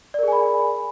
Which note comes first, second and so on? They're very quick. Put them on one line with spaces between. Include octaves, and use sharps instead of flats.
D5 A#4 G#4 G#5 B5